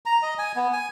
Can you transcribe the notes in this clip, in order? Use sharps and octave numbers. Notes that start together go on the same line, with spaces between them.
A#5
D#5
G#5
B3
G#5